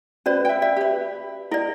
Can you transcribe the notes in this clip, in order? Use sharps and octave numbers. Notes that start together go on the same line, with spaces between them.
C#4 F#4 B4 C5 D5
E5 G5
D5 E5
G4 B4
E4 A#4 D5 D#5